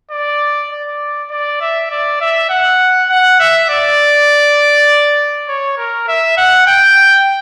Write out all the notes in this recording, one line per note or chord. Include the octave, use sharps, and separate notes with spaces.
D5
D5
D5
E5
D5
E5
F#5
F#5
E5
D5
C#5
A#4
E5
F#5
G5